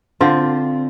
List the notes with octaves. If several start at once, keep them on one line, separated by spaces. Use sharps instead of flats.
D3 C4 F4